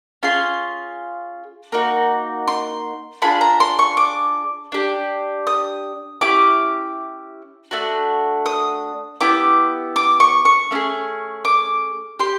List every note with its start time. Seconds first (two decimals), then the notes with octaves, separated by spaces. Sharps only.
0.23 C#4 F4 G#4 C6
1.72 A#3 D#4 F#4
2.48 C6
3.22 D4 F4 G#4 B5
3.41 A#5
3.60 C6
3.79 C#6
3.97 D6
4.72 D4 G4
5.47 D#6
6.21 C#4 E4 G4 D6
7.71 A3 D4 F#4
8.46 D#6
9.21 B3 E4 G4 D6
9.96 D6
10.20 C#6
10.45 C#6
10.71 A3 C#4 F4 G#4
11.45 D6
12.20 G4 C6